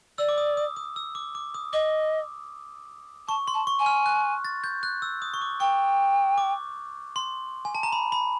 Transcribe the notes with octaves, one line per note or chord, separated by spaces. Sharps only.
D5 E6
D6
D#6
D#6
D#6
E6
D6
D6
D#6
D#5 D6
A5 C#6
C6
A5
C#6
G#5
F6
F#6
A6
G6
F#6
E6
D#6
C#6
D6
G5 C#6
D6
C6
G#5
A5
A#5
B5
B5